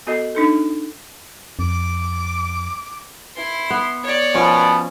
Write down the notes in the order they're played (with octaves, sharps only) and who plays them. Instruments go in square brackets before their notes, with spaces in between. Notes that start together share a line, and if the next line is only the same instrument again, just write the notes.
[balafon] B3 F#4 A4 D#5
D4 D#4 A4
[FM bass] F2 [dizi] D6
[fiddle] E4 C6
[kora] B3
[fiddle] C#5 D5
[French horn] B2 [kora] F3 C#4